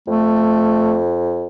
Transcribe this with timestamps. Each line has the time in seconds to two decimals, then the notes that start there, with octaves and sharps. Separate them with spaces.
0.07 F2 A3